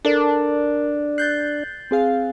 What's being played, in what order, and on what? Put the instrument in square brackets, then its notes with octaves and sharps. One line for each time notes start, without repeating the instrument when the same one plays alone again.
[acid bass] D4 [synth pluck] A4 D5 [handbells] A#4
[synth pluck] F#6 G6 [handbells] A6 C7
[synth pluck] C4 G#4 F5